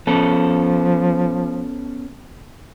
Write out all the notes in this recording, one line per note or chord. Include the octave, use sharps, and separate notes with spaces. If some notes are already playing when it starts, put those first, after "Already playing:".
F3 B3 C#4 A4